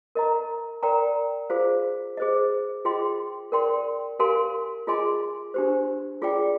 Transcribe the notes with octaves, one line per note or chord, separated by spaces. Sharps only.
A#4 D#5 A#5
A#4 D5 G5 A#5
F4 G#4 C5 F5
G#4 C5 D#5
F4 G#4 D#5 G5 C6
A#4 D5 G5 C6
G4 A#4 F5 G#5 C6
F4 G#4 D#5 G#5 C6
D4 G4 C5
F4 G#4 D5 G5